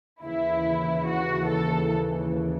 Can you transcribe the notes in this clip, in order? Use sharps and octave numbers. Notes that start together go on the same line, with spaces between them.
D#2 C#3 E3 E4
F#4
A4